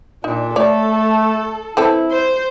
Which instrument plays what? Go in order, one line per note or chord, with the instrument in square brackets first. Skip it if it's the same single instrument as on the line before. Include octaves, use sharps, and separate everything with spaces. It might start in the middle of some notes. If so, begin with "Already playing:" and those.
[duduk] A#2 [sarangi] D4 [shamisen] D#4
[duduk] A3 [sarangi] A4 [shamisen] C#5 D5
[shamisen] E3 C4 A4 [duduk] E4
[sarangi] C5